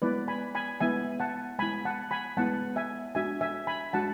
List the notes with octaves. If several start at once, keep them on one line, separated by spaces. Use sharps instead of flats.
G#3 B3 E4 B4 D5
G#5 B5
G#5 B5
G#3 B3 E4 E5 G#5
F#5 A5
G#3 B3 E4 G#5 B5
F#5 A5
G#5 B5
G#3 B3 E4 F#5 A5
E5 G#5
G#3 D4 F#4 E5 G#5
E5 G#5
G#5 B5
G#3 D4 F#4 F#5 A5